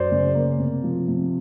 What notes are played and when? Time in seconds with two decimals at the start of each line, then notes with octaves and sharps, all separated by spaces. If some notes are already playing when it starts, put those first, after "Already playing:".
Already playing: F#2 C5 D5
0.12 C#3
0.35 A#3
0.59 C3
0.84 F3
1.08 C3